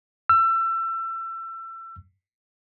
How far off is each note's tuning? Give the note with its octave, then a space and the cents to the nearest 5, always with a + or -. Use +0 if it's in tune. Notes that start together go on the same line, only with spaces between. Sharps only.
E6 +30